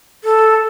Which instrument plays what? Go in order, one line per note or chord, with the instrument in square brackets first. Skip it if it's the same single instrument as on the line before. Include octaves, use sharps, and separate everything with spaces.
[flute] A4